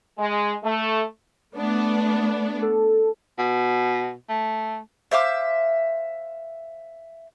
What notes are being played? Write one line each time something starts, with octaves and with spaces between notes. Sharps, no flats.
G#3
A3
A3 B3 D4
A4
B2
A3
C5 E5 F5 D6